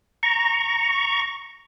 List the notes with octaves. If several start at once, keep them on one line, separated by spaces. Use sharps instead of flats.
A#5 C#6